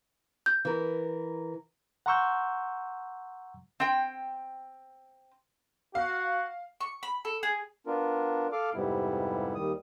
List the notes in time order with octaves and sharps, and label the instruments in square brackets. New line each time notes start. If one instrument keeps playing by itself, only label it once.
[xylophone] G6
[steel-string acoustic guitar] E3 A#4
[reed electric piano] F#5 A#5 C6 C#6 E6 G6
[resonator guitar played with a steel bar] C4 G5
[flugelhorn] F#4 [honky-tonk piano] F5
[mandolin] C#6
B5
A4
G#4
[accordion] B3 D4 F4 A#4
A4 F5 D6 F6
F2 G#2 C3 G3 B3 E4
D#2 D#3 G3 D#6